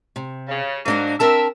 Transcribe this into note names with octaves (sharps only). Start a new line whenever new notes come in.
C3
C#3
G#2 F#3 A#3 D4 D#4
C4 A#4 E5 A5